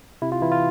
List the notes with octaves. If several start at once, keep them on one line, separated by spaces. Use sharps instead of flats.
C3 E4
F4
E3 E4
F4